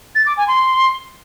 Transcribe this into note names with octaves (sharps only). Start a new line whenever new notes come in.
A6
D6
G#5
C6